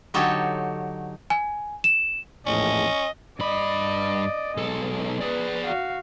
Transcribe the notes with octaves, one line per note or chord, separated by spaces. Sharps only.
D3 F#3 D#4 G4 A4 C#5
G#5
E7
A#1 E2 A2 C#4 D#5
G2 D5 D#5 B5
B1 G#3 A4
G#4 B4 D5
F#4 F5